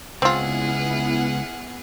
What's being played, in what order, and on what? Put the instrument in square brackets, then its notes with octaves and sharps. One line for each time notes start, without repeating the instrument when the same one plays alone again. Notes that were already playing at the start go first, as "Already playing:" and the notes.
[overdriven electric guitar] C#2 [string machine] B3 E4 F6 [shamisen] C4 F4 [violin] G#4 F#5